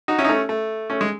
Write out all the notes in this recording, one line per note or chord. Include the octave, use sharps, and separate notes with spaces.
D#4 F#4
C#4 E4
D#4
A3 C#4
A3
A3 C#4
G#3